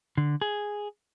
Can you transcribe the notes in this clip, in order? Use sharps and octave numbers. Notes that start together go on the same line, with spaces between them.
D3
G#4